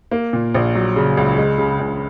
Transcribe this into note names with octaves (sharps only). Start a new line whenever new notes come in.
A#3
A#2
A#1
F#3
C#3
C#2
G#3
C#3
C#2